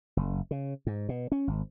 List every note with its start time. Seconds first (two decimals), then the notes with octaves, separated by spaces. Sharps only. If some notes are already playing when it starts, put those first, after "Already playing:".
0.17 F#1
0.51 C#3
0.87 G#2
1.09 B2
1.32 C#4
1.47 G#1